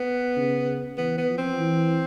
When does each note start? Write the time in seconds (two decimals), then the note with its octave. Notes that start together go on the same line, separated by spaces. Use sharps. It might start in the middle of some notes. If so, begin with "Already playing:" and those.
Already playing: B3
0.36 C#3
0.97 E3 B3
1.18 B3
1.28 F3
1.38 C4
1.59 E3